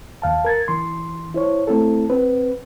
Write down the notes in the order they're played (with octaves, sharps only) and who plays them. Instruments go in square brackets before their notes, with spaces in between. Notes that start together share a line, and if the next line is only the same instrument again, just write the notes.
[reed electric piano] D#2 F5 A5
A#4 G#6 A6
E3 C6
E4 C5 C#5
A3 C4 E4 A4
C4 B4